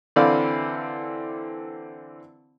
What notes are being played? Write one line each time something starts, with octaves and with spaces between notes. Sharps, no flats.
D3 E3 C4 D5 F5 B5